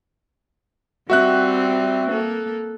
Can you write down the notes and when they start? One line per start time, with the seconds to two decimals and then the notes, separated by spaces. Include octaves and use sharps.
1.10 G3 C4 F#4 E5 F#6
2.09 A#3 A4